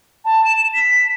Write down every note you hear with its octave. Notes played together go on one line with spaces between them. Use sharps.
A5
E7
B6